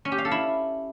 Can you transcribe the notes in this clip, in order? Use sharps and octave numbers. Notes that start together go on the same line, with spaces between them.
C#4
G4
F5
A4
E4